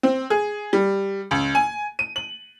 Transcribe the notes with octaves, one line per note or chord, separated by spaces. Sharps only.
C4
G#4
G3
C#2
G#5
D#7
F#7